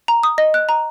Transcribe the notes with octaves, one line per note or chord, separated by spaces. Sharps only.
A#5
D#6
D#5
F#6
A#5